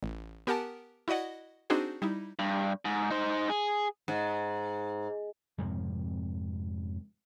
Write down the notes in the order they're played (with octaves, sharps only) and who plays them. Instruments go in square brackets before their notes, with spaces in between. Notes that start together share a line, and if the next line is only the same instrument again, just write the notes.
[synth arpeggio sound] A1
B3 G4 A#4 F#5 G#5 A5
E4 F#4 D5 D#5 F#5
C4 D4 D#4 F#4 G#4 C5
G3 D#4 E4
[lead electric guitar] G2
G#2
D#4 C5
G#4
[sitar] G#2
[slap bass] F2 G#2 C3 F3